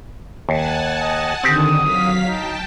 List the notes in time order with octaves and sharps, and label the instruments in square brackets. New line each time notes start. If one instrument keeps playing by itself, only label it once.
[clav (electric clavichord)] D#2 [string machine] F#5 G#5 A5
[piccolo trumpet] D#5
[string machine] D3 D#3 [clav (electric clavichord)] C4 G4 [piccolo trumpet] D#6
[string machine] F#3 F5 B6
[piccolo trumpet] D#4 [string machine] G5 A5